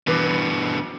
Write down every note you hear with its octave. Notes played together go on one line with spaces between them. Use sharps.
G2 B2 E3 B4 D6